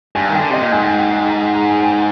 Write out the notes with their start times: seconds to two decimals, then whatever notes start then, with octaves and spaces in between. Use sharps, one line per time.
0.15 G2 G#5
0.29 D#3
0.34 G5
0.39 D3
0.50 C3 D#5
0.61 A#2
0.72 G#2 G#5
0.85 G5
0.99 G5
1.14 G#5
1.27 A#5
1.41 G#5
1.55 A#5
1.70 G#5
1.83 G5